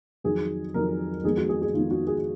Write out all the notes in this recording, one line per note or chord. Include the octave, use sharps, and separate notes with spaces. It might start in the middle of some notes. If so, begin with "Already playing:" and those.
F2 D#3 F#3 G#4
F2 D#3 F#3 A#4
F2 D#3 G#3 B3 G#4
F#4
G#4
G#4
F2 D#3 G#3 B3 F4
F#4
G#4